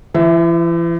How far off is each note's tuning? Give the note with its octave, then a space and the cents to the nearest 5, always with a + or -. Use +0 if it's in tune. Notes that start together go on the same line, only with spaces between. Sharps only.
E3 +40 E5 +0